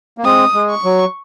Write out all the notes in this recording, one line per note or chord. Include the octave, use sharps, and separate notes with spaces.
A#3
G#3 C4 D#6
G#3
C#6
F#3